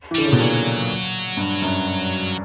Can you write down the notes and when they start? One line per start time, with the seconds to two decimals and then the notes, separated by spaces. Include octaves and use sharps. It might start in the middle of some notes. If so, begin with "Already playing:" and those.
0.11 E3
0.15 D3 G3
0.25 C#3
0.32 B2
0.39 A#2 F#3
1.37 G2
1.62 F#2